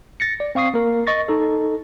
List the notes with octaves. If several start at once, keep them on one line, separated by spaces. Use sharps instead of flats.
A6 A#6 C#7
D5
C4 F5 C#6 D#6 C7
A#3 A#4
D#5 C#6 A6 A#6
D#4 A4